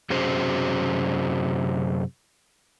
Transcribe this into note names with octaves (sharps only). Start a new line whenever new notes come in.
F#2 C3 C#4 F#4 G#4 C5